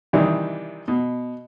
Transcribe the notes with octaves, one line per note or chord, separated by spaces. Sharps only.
C3 D#3 E3 G3 D4
B2